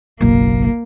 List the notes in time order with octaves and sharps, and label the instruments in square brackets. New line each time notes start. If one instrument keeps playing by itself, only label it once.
[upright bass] F#1 B1 [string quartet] A#3